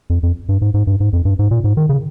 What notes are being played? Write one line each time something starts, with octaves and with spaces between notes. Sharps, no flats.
F2
F2
G2
G#2
G#2
G2
G#2
F2
G2
G#2
A#2
G#2
D#3
C#3